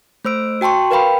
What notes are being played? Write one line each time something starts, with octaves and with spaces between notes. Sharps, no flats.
A3 C5 E6 D7
F#4 G5 A5 C6 C#6
A#4 B4 F5 G5 B5